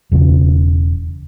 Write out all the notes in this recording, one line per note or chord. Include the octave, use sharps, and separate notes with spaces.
E1 E2 C#3 E3